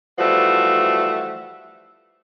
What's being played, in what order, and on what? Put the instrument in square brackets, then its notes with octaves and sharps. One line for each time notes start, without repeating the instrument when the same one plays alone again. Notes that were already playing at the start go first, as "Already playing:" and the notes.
[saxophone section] E3 F3 G3 A3 F#4